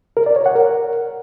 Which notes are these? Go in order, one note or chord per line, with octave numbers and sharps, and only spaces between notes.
A#4
D5
C#5
F#5
A#4